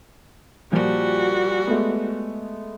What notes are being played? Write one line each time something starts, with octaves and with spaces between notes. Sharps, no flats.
A#2 F3 G3 F#4
G#3 A3 B3